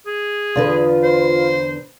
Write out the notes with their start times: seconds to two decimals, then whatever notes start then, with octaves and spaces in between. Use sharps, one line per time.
0.06 G#4
0.56 E2 D3 F4 B4
1.03 C5